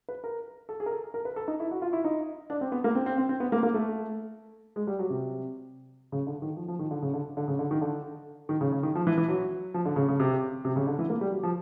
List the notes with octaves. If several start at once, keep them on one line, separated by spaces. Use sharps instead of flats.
B4
A#4
A4
G#4
A#4
A4
A#4
B4
A4
D#4
E4
F#4
F4
E4
D#4
D4
C4
B3
A#3
C4
C4
C4
C4
B3
A#3
A#3
A3
G#3
G3
F#3
C3
C#3
D3
D#3
F3
F3
D#3
D3
C#3
D3
D3
C#3
D3
D#3
D3
D#3
C#3
C#3
D#3
F3
E3
E3
F#3
F3
D3
C#3
C#3
C3
C3
C#3
D3
E3
A#3
G3
F#3
F3